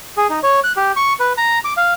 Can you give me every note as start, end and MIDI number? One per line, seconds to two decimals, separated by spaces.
0.17 0.27 68
0.30 0.39 63
0.43 0.60 73
0.64 0.72 90
0.77 0.92 67
0.96 1.13 85
1.20 1.33 71
1.38 1.59 82
1.65 1.73 86
1.77 1.94 77